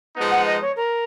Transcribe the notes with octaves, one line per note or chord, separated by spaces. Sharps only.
F3 G#3 B3 D#4
F#5
D#5
C#5
A#4